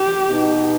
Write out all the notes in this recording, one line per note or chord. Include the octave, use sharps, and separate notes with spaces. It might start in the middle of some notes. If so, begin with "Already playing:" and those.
Already playing: G4
B2 B3 D#4